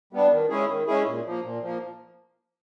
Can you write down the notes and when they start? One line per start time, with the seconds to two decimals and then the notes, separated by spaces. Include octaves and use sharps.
0.13 G3 B3 D4
0.31 D#3
0.50 G#3 C#4 E4 G#4
0.68 D#3
0.87 G#3 C#4 E4 G#4
1.06 A#2
1.26 F3 A#3
1.43 A#2
1.62 F3 A#3